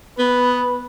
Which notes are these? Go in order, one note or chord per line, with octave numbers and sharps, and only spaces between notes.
B3 B4